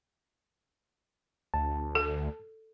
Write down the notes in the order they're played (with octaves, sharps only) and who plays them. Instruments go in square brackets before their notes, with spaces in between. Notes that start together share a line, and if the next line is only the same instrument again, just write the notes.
[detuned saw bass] D2 [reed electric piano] A5
[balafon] A4